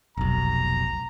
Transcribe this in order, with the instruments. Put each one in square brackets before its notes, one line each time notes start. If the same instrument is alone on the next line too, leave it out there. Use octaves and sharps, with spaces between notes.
[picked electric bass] F1 B1 [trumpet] A#5